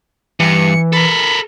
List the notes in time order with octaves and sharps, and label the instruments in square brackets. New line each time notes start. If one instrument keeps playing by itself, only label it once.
[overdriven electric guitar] G2 [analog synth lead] E3 [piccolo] C#7
[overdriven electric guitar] A4 A#4 [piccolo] B5